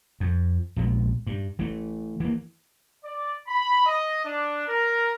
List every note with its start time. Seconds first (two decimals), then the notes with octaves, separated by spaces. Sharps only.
0.20 F2
0.76 A#1 B2 F3 G#3
1.27 G2
1.59 E3 A3
2.20 E3 A#3
3.04 D5
3.48 B5
3.86 D#5
4.25 D4
4.68 A#4